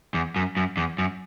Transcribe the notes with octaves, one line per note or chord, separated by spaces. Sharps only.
E2
F#2
F#2
E2
F#2